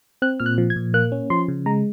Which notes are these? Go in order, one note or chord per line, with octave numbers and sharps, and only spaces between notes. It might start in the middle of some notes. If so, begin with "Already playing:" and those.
C4 F#6
A#2 F6
F#6
F3
G#6
A#2
A#3 F#6
C#4
F3 C6
C#3
G#3 A#5